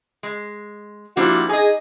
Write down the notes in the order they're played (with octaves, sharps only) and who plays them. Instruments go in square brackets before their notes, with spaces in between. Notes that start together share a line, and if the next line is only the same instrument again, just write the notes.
[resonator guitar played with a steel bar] G#3
[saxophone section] F3 E4 F#4 [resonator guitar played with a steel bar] G3 A#3 D4
[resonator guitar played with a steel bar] D#4 D#5 [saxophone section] G#4